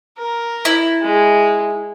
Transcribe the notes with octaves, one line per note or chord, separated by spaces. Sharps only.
A#4
E4
G#3